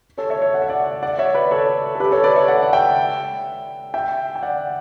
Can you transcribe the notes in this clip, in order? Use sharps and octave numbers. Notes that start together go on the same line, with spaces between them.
A4 C#5
C#5 E5
C#5 E5
F#5
E5
D5 F#5
D5 F#5
C#5 E5
B4 D5
A4 C#5
A4
G4 B4
A4 C#5
B4 D5
C#5 E5
D5 F#5
F#5
E5 G5
E5 G5
G5
D5 F#5